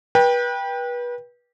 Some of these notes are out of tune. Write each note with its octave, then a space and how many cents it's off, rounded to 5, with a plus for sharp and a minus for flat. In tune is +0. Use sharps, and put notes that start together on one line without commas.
B4 -30 G5 +10